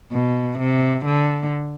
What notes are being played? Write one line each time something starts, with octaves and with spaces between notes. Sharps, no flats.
B2
C3
D3